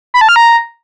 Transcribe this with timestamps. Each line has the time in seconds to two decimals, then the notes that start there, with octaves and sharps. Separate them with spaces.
0.14 B5
0.21 A5
0.29 F6
0.36 A#5